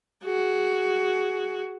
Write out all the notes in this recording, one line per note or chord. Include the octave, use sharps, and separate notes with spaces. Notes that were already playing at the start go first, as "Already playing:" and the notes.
F#4 G#4